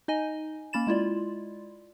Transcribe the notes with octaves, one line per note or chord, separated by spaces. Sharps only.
D#4 D#5 G#5
A#3 C#4 B5 A6 E7
G#3 E4 F4 D5